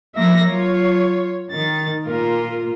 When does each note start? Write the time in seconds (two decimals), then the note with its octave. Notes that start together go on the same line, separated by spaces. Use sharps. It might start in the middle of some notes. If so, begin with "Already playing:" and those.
0.15 F3 A#3 E5 A#6
0.45 F#3 F4 C#5
1.51 D#3 A6
2.06 A#2 F4 A#4